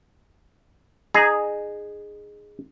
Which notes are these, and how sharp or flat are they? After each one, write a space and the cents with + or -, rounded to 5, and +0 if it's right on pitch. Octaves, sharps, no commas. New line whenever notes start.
D#4 -25 G#4 +0 A#5 +0